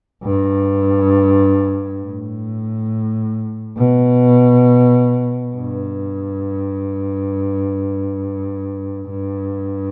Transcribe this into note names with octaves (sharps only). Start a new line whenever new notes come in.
G2
A2
B2
G2
G2